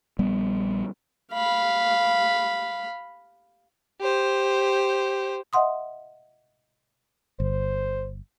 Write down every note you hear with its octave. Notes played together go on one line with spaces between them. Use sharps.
A#1 G3 B3
F5 B5
G4 C5
D#5 E5 F#5 C6 D#6
G1 C5